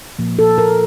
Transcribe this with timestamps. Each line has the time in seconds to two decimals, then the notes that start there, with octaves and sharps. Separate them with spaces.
0.19 A#2 F3 A#3
0.39 A4
0.58 A#4